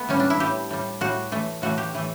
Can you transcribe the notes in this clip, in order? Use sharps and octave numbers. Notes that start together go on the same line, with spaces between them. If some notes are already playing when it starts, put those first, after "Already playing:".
Already playing: A3 B3
A2 G3 C#4
D4
E4
A2 G3 G4
A2 G3
A2 G3 F#4
A2 E3 A3
A2 E3 A3 F#4
G4
A2 E3 A3